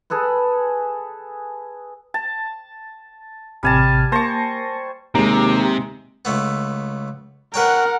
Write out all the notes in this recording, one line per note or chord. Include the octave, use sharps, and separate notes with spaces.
G#4 A4 B4 B5
A5
A1 C3 G3 G#5 A5 F6
A#3 C5 A5 C#6 A#6
D#2 C3 G#3 A#5
C#2 A3 B3
A#4 B4 C#5 F#5 G5